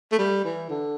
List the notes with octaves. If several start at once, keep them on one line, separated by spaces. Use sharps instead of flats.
A3
G3
E3
D3